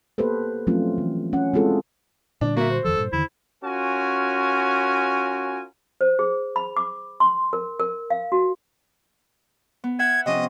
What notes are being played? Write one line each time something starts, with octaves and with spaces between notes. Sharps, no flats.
A#3 B3 G4 A4 B4 C5
F3 F#3 A3 C4 C#4 F4
E3
C#4 F#5
G#3 C4 E4 F4 G#4 A4
A#2 D3 G3 D4
A#3 F#4 E5
C5
F2 D#3 F3 A4
G2 A#2
E2 D3 D#3 E4
C#4 F4 F#4 A#4 G#5
C5
G#4
B5
D6
C6
A#4
A#4
F5
F#4
B3
E5 F#5 G#6
C3 F3 C#4 D#5